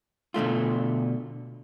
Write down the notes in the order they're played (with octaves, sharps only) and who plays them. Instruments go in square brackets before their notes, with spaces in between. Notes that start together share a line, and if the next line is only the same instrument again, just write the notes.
[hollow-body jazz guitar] B2 D3 A3 F4